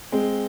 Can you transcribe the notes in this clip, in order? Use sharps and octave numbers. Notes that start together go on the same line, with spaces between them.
G#3 C4